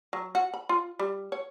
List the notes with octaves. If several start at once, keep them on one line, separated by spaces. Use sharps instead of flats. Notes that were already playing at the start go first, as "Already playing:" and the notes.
F#3
F#4
B5
F4
G3
C#5